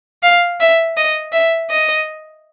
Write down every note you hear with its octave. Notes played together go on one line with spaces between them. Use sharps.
F5
E5
D#5
E5
D#5